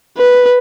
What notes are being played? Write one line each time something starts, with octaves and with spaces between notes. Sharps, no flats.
B4